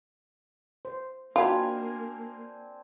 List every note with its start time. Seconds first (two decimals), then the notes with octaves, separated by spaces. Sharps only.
0.85 C5
1.36 A#3 C4 D4 D#4 F4 F#4 G#5 B5